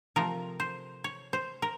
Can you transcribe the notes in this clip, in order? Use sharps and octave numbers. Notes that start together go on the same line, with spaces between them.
C3 F3 A3 A#4
C5
C#5
C5
A#4